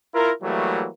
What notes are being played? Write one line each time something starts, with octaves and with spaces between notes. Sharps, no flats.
E4 F4 A#4
E3 F#3 G3 A3 A#3